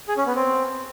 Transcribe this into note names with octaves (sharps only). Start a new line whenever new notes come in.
G#4
C#4
B3
C4